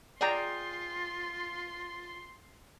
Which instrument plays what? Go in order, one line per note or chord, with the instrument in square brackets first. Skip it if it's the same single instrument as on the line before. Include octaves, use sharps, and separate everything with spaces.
[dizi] F4 [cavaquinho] G#4 G5 [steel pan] D5 A#5 [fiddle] C6